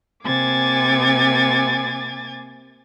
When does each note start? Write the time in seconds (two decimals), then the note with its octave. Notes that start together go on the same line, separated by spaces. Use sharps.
0.24 C3 A#3 G#5 D6 G#6 A6